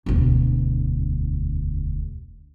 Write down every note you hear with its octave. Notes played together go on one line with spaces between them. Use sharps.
E1 D2